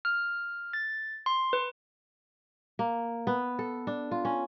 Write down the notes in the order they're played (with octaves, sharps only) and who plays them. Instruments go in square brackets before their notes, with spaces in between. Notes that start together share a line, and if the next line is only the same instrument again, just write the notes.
[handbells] F6
A6
C6
B4
[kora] A#3
B3
A4
D4
F4
C#4